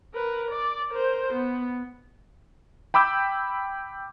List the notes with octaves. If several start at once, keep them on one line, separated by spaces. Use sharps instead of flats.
A#4 B4
D5
A#4 C5
B3
G5 B5 D6 E6 G6